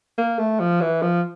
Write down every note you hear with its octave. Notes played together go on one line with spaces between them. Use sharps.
A#3
A3
F3
E3
F3